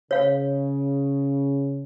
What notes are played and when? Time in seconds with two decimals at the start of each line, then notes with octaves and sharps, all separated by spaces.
0.11 C#3 C#5 F5